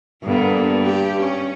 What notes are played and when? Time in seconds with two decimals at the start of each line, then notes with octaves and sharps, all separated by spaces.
0.23 G2 D3 A#3 B3
0.84 G4
1.19 C#4